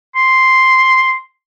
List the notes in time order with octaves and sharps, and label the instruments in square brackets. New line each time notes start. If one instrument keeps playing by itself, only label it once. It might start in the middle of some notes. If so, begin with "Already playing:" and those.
[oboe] C6